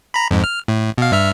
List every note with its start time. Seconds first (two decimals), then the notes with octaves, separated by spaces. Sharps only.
0.14 A#5 B5
0.31 F2 G#2
0.44 F6
0.68 A2
0.98 B2 F5
1.12 G2 E5 F6